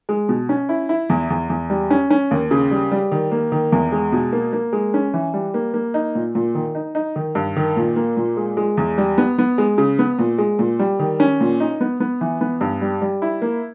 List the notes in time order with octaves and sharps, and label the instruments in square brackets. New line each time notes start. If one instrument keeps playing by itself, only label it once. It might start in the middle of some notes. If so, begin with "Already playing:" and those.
[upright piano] G#3
B2
C#4
E4
E4
E2
E2
E2
G3
C#4
C#4
D#2
C#3
G3
G3
D#3
A#3
D#3
E2
G#3
B2
A#3
A#3
G#3
C#4
E3
G3
A#3
A#3
D#4
A#2
A#2
D#3
D#4
D#4
D#3
G2
D#3
A#2
A#3
A#2
G#3
G#3
E2
G3
B3
B3
G#3
C#3
B3
A#2
G#3
A#2
G3
D#3
C#4
A#2
D#4
B3
B3
E3
B3
G2
G3
G3
E4
A#3